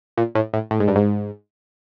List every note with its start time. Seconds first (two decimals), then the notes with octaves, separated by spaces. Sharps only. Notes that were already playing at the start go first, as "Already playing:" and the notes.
0.17 A#2
0.35 A2
0.54 A2
0.71 A2
0.80 G#2
0.88 G2
0.95 G#2